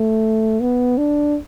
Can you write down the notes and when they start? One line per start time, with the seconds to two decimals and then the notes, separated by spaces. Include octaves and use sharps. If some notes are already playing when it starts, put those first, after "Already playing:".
Already playing: A3
0.61 B3
0.98 D4